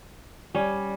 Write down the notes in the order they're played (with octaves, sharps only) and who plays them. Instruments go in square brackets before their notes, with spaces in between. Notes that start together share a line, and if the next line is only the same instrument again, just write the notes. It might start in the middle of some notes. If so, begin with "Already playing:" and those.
[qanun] G3 [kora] C#4